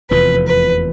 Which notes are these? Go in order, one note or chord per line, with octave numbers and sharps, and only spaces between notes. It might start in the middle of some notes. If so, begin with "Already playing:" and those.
F1 E2 C3 F3 B4
B4